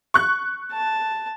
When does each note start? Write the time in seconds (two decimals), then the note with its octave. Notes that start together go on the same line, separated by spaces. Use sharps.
0.14 C#6 F#6
0.72 A5